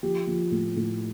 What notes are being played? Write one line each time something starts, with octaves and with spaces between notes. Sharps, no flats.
F3 G4
F3
A2
A2